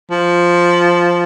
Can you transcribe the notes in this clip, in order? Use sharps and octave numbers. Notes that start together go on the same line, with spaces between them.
F3